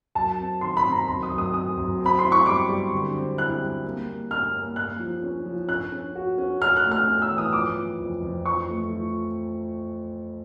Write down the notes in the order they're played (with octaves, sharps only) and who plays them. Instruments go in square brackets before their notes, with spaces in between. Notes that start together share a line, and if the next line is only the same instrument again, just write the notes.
[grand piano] F#2 [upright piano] A5
[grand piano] C4
[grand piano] D#3 [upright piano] C6
[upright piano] B5
[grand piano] C4
[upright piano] A#5
[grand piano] F#2 [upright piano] C6
[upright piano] D#6
[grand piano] F#2
[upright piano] D#6
[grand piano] C4 [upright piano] D#6
[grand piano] F#2
C4
[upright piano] B5
[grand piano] E4 [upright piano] C6
[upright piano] C#6
[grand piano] G3 [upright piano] D6
[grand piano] G3
D3
C4
[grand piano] E4 [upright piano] F#6
[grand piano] G3
A#3
A#3
[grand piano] C#4 [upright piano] F6
[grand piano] A#3
[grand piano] A#3 [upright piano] F#6
[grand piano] F3
C#4
F3
[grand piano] C#4 [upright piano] F#6
[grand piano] C#4
F#4
C#4
[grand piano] F#4 [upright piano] F6
[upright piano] F#6
[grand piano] A3
[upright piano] F6
[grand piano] C#4
[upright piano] E6
[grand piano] E3
[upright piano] D#6
[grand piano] F3 [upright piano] D6
[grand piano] F3
F2
F2
[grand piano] F3 [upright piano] C#6
[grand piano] A3
F3